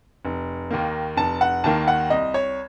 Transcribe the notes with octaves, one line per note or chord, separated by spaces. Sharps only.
F1
D#2 D#3 A#3
F1 A5
F#5
D#2 D#3 A#3 A5
F#5
C2 D#5
C#5